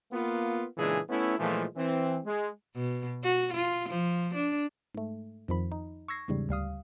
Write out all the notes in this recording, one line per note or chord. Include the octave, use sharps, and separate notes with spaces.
A#3 B3 F4
A#2 C#3 E3 G#3 D4 G#4
A3 B3 C#4 E4
A#2 E3 F3 G#3 A3
E3 C4
G#3
B2
F#4
F4
F3
D4
G#2 A3
F2 D#3 F3 B5
D#4
C#6 E6 G#6 A#6 C7
E2 G#2 C#3 G3
D2 G3 F5 D#6